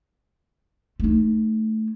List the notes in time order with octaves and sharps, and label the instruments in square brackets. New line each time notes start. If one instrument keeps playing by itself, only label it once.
[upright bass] A3 D#4